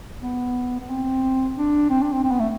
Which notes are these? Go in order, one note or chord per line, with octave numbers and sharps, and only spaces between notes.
B3
B3
C4
D4
C4
D4
C4
C4
B3
A3